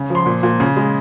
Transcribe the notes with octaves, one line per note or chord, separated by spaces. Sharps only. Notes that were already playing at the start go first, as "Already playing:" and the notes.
Already playing: C#3
F3 C6
A#2
A#2
C#3
G#3